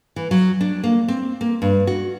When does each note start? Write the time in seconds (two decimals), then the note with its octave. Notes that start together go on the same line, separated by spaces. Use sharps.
0.16 E3
0.31 F#3
0.61 D4
0.84 A#3
1.08 C4
1.41 A#3
1.62 G2
1.87 F#4